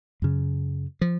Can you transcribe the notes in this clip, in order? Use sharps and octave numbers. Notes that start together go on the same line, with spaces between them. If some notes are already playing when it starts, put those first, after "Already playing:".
F#2 C#3
F3